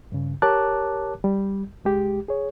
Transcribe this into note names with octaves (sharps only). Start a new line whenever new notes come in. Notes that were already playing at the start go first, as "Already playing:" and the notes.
G2 C#3
G4 A#4 C#5 A5 D6 F#6
G3
C2 G#3 G4
G#4 C#5